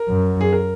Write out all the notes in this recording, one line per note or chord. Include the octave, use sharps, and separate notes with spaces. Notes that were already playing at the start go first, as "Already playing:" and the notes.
Already playing: A#4
F#2
G#4
A#4